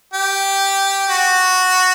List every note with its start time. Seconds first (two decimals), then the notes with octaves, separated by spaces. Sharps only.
0.14 G4
1.09 F#4